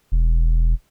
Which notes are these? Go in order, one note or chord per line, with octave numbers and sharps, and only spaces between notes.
E1